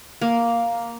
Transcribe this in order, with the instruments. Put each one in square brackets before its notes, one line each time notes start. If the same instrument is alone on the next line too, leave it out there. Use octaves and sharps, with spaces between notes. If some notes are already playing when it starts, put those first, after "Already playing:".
[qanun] A#3